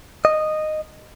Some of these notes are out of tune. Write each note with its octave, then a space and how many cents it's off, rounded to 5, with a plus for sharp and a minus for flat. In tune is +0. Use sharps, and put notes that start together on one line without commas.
D#5 -10